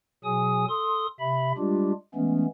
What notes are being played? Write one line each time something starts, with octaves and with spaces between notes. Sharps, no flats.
B2 F#3 G#4 G#5 D#6
A4 C6 D#6
C3 E5 B5
G3 G#3 D4 F4 G4
E3 G#3 A3 B3 C#4